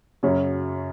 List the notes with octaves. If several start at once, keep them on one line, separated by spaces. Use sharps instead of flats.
F#2 C#3 F#3 C#4